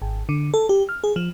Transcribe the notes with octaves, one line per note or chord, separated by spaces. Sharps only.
G#1
D3
A4
G4
F6
G#4
F3